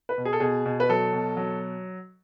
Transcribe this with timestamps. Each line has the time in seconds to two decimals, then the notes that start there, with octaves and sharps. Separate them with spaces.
0.09 B4
0.18 B2
0.25 G#4
0.33 A4
0.40 B2 G#4
0.66 B2
0.80 B4
0.89 F#3 A4
1.13 B2
1.37 F#3